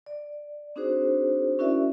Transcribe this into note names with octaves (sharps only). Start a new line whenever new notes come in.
D5
C4 D4 D#4 F#4 G#4 C5
C#4 E4 F#4 A#4 D5 E5